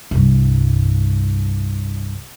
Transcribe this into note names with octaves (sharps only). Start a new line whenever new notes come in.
C2 G2